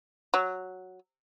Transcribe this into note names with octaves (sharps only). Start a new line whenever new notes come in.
F#3